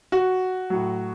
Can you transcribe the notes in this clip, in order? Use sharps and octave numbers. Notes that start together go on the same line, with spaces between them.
F#4
A2 F#3